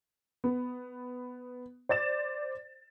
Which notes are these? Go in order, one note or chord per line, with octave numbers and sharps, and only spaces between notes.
B3
C5 D5 A6 E7